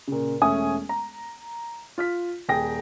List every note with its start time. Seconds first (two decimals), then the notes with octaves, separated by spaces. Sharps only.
0.08 A#2 C#3
0.42 E1 A3 C#4 G#5 D#6
0.89 A#5
1.98 F4 F6 B6
2.48 D#1 G#4 G5 A#6